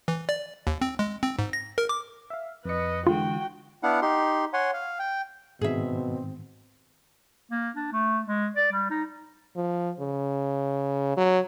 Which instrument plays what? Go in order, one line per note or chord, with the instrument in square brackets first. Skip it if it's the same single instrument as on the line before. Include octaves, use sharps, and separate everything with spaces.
[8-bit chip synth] E3
D5
D#2
C4
G#3
C4
G#2
A#6
A#4
D6
[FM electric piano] E5 F5
[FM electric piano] F2 C#7 [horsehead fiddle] B4 D#5
[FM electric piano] D3 E3 G#3 [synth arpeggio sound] F4 [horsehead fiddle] F#4 G5
[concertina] B3 D4 E4 F5 F#5
D#4 G4 C6
C#5 F#5 G#5 C6
F5
G5
[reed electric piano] G#2 D#3 [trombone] B2 [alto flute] C4 [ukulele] G#4 E5
[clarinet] A#3
D4
A3
G#3
D5
G3
D#4
[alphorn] F3
C#3
F#3